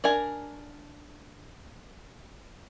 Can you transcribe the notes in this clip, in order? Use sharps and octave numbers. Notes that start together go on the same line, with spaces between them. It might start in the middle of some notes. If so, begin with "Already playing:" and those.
D4 A#4 G#5 A#5